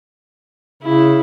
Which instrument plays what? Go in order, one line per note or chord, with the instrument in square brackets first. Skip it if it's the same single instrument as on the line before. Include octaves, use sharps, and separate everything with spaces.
[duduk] C#3 [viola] E4